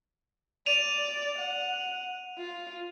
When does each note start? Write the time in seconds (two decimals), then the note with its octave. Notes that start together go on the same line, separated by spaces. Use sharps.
0.66 D5 D#7 F7
1.38 F#5
2.38 F4